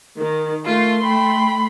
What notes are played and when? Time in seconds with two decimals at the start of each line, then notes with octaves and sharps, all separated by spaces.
0.18 D#3 A#4
0.66 A3 F4 A#4 C6
1.04 G5 B5